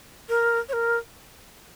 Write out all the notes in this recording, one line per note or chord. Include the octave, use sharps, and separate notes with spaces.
A#4
C#5
A#4